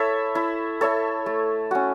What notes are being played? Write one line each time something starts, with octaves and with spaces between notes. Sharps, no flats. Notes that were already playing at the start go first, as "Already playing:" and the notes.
Already playing: E4 A4 C#5 E5
E4
A4 C#5 E5
A3
C#4 F#4